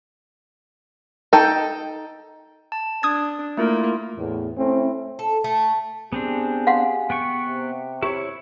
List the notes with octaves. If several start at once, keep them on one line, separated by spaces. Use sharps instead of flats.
D#4 A4 G5
A5
D4 D#6 G#6
A3 A#3 E4 F4
E2 A2
A3 C4 C#4 E4
A4
A3
B3 C4 D4 G4 G#4 G#5
F5 F#5 C6
B3 G5 C#6
C3
E4 G4 C#5